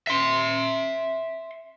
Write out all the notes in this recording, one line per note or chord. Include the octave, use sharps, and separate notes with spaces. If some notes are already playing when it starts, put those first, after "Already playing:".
E5 C6